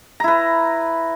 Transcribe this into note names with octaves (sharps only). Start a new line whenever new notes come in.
E4 B4 A#5